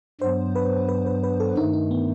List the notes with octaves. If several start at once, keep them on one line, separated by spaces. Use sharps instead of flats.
G2 F#3 B3 C5
B4
B4
B4
B4
A4
G2 D#3 A3 D#4
D#4
B3